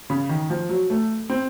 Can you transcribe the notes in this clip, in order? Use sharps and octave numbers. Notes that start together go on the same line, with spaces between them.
C#3
D#3
F3
F#3
A3
C4